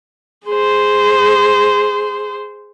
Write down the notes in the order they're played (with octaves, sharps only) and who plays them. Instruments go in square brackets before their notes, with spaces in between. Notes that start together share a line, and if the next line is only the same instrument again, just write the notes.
[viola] G#4 C5